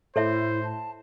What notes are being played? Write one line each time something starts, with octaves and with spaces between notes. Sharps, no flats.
A2 E4 A4 C5 C#5 E5
A5